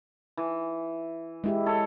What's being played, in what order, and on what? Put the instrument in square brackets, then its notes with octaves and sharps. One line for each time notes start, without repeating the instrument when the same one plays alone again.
[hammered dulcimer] E3
[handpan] G#3 E4 G4
[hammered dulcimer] A4 C#5